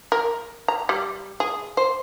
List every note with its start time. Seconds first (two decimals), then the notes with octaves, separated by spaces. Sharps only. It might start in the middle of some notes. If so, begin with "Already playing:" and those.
0.12 A#4
0.68 A#5
0.89 G3
1.40 G#4
1.77 C5